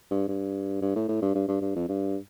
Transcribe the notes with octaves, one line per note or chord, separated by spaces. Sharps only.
G2
G2
G2
A2
A2
G2
G2
G2
G2
F2
G2